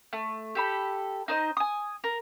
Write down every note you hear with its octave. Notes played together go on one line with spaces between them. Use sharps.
A3
G4 A4 B5
D#4 C5 D#5
G#5 D#6
A#4